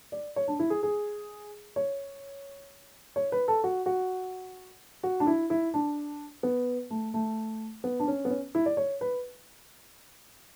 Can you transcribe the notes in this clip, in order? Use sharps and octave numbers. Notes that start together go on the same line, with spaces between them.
D5
C#5
D4
E4
G#4
G#4
C#5
C#5
B4
A4
F#4
F#4
F#4
D4
E4
E4
D4
B3
A3
A3
B3
D4
C#4
B3
C#4
E4
D5
C#5
B4